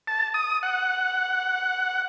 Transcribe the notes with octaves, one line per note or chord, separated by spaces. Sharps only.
A5
D#6
F#5